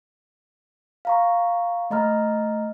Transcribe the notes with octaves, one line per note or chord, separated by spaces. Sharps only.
F5 A#5 C#6
A3 D#5 A#5 F6